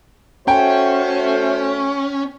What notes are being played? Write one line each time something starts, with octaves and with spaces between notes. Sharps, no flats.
A3 C#4 F#4 C5 G5